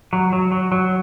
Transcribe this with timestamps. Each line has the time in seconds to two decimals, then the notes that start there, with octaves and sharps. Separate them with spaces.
0.13 F#3
0.33 F#3
0.52 F#3
0.72 F#3